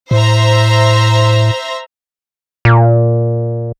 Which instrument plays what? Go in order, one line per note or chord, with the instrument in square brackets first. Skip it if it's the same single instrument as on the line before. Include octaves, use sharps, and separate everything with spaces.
[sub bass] A2 [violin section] C5 E5 A#5
[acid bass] A#2